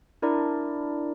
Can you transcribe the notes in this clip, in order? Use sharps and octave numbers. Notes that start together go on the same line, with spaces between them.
D4 E4 A#4 D5 A#5